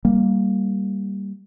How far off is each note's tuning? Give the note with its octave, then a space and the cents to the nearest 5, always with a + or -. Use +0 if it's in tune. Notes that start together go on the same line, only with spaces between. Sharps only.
G3 +0 A#3 +0